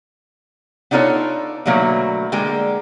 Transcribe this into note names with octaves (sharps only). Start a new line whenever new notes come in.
B3 D4 D#4 F4 A4 C#5
B2 D3 F#3 A3 A#3
D3 G#3 A#3 G5